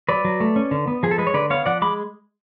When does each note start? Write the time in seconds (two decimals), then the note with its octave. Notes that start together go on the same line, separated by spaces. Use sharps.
0.09 F#3 B4 D5
0.25 F#3
0.40 A3
0.56 C#4
0.71 D3
0.88 B3
1.03 F3 G#4
1.11 A4
1.18 G#3 B4
1.27 C#5
1.34 D3 B4 D5
1.50 B3 C#5 F5
1.66 F3 D5 F#5
1.82 G#3 B5 D6